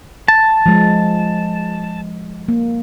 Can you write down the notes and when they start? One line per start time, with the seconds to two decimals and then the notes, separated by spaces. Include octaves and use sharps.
0.28 A5
0.66 F3 G#3
2.48 A#3